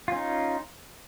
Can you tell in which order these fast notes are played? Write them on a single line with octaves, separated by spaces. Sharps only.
F4 C#4 D#4